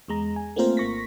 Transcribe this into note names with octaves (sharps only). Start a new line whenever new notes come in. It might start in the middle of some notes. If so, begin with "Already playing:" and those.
E2 G#3 A#5
G#5
A3 A#3 C4 F4 A#4 C5
G#1 A#3 C#6 A#6 B6